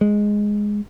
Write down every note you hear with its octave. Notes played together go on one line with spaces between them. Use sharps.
G#3